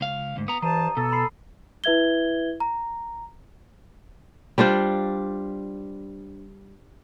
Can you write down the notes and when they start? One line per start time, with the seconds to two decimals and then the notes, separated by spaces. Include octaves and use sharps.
0.01 C#2 F5
0.36 D2 G#2
0.48 B3 A#5 D#6
0.62 G2 E3 C5 A5 A#5 D#7
0.97 B2 A4
1.12 B5 C6 C7
1.84 E4 B4 E5 G#6 G7
2.60 A#5
4.58 G3 D4 F4 C5